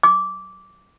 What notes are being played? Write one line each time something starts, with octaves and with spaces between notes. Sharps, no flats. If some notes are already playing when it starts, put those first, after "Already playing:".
D6